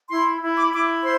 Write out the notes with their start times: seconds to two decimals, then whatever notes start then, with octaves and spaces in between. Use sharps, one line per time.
0.10 E4 C6
0.41 E4
0.56 D6
0.72 E4 D6
1.02 C5 C6